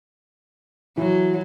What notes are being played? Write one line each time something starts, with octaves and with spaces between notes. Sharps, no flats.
E3 F#3